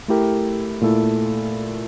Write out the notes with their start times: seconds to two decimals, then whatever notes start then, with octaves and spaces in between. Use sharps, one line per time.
0.08 A3 E4 G4 A#4
0.81 A#2 A3 E4 A4